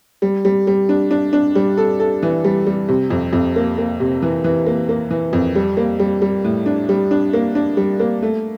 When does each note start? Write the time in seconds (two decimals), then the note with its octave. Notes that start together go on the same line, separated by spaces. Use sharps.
0.22 G3
0.45 G3
0.67 G3
0.89 D4
1.11 D4
1.33 D4
1.55 G3
1.77 A4
2.00 A4
2.23 E3
2.44 G3
2.66 G3
2.88 C3
3.10 F2
3.33 F2
3.56 A#3
3.78 A#3
4.00 C3
4.22 E3
4.44 E3
4.66 A#3
4.89 A#3
5.10 E3
5.33 F2
5.55 G3
5.77 A#3
6.00 G3
6.22 G3
6.44 A2
6.66 D4
6.89 G3
7.11 D4
7.33 A#3
7.55 D4
7.77 G3
8.00 A#3
8.22 A3